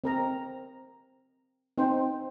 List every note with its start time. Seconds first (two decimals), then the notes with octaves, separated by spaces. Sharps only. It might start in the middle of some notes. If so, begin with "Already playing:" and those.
0.04 C4 A#4 A#5
1.78 C4 D#4 C5 G5